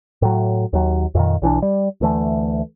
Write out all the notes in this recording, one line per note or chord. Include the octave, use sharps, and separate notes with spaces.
A2 F#3
D#2 F#3
F2 A#2 D#3
B1 E3 C#4 D4
G3
D2 E3 A3